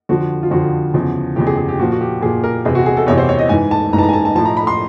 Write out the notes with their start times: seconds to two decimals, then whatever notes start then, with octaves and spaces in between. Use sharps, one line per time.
0.09 F2 D3 F3 F#4
0.43 F4
0.51 F2 D3 F3 F#4
0.94 E2 C#3 F3
1.36 E2 C#3 F3 G4
1.47 G#4
1.57 G#4
1.68 G4
1.79 A#2 F3 F#4
1.92 F#4
2.01 G4
2.21 A#2 F3 G#4
2.44 A#4
2.65 E2 C3 E3 G#4
2.75 F#4
2.86 G#4
2.97 A4
3.07 E2 C3 E3 C#5
3.18 C5
3.29 C#5
3.39 D#5
3.49 G#2 E3 G#5
3.71 A5
3.93 G#2 A#5
3.96 E3 A5
4.03 A#5
4.09 G#5
4.13 A5
4.25 A5
4.35 A2 F3 A5
4.45 A#5
4.57 B5
4.67 C6